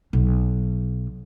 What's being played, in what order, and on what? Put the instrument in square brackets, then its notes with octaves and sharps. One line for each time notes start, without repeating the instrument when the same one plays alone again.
[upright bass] B1